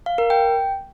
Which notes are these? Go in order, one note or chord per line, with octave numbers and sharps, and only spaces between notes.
F5
A#4
G5